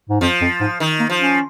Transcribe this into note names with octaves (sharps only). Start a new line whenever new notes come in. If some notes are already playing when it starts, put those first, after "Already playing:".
G#2
F2 F3
F2
G#2
D#3
A#3
F3
C#4